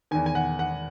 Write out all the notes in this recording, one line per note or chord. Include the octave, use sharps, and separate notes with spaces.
E2 D#3 G#5
G#5
F#5
F#5